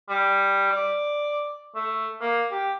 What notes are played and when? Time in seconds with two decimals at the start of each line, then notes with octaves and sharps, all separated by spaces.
0.09 G3
0.72 D5
1.75 A3
2.21 A#3
2.52 G4